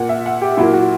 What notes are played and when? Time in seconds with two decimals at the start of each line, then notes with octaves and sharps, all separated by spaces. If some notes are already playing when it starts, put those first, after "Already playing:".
Already playing: A#2 A#3 F#5
0.09 E5
0.26 F#5
0.41 G4
0.57 A#2 F#3 A#3 E4
0.73 F#4